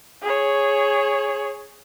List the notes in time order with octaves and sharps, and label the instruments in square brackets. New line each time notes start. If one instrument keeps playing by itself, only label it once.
[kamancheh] G#4 C#5